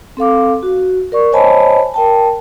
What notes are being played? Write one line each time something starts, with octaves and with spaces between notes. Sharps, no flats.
C4 A4 F5 D6
F#4
A#4 D5 C#6
C5 C#5 D#5 G#5 A5 B5
A#4 G5 A5